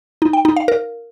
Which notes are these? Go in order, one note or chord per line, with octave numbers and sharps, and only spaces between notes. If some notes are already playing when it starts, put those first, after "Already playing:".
D#4
G5
D#4
F5
A#4